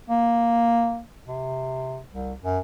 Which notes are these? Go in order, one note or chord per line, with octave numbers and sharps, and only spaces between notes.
A#3
C3
C2
F#2